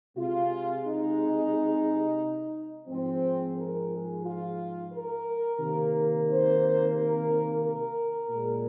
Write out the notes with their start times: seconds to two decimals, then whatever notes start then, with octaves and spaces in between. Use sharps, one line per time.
0.16 C3 G#3 F4
0.84 D#4
2.88 G#2 F3 G#3 C4
3.55 A#4
3.90 G#4
4.23 F4
4.91 A#4
5.58 C3 D#3 A#3
6.27 C5
6.94 A#4
7.62 A#4
8.30 A#2 G#3